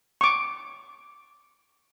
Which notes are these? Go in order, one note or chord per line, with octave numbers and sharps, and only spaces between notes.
C#6 D6